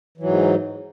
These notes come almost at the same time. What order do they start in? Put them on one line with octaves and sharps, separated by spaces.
E3 F#3 G#2